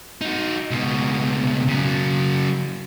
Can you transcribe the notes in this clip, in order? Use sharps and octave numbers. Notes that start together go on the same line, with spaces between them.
D#4 F#4
C#2 B2
C#3 F#3